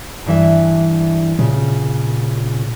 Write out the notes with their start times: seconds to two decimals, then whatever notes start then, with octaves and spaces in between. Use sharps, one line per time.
0.26 G2 E3 E5
1.39 A#2 C#3